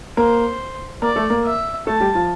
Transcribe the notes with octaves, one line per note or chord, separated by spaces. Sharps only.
A#3 A#4 C5
A#3 A#4 D5
A3 A4
A#3 A#4
E5
A3 A4 A5
G3 G4
F3 F4